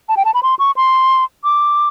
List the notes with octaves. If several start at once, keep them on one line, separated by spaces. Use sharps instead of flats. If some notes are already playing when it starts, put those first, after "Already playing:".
A5
G5
A5
B5
C6
C#6
C6
D6